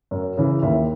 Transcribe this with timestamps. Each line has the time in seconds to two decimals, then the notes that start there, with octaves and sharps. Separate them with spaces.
0.11 F#2
0.37 C#3 E3
0.62 D#2 E5